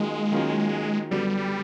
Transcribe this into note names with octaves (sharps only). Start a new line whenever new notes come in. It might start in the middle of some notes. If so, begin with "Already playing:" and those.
Already playing: D#3 F#3 G#3 A#3 C#4 F4
D#3 F#3 A#3 C#4 F4
F#2 D3 F#3 G3 B3